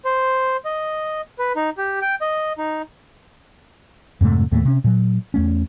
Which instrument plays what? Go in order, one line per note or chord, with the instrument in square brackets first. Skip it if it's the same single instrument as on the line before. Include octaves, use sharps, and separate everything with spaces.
[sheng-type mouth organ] C5
D#5
B4
D#4
G4
G5
D#5
D#4
[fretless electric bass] F2 G#2 C3 A3
D#2 A2 A3 A#3
C3 C#4
A#2 F#3
E2 A3 C#4